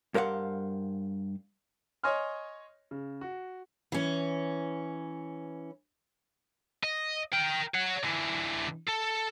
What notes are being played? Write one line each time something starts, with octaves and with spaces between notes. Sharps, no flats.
G2 A#4 C5 F5 F#5
C#5 D#5 G#5 C6 F6
C#3
F#4
E3 C#4
D#5
A#4 G5
C#5 F#5
D3 E3
A4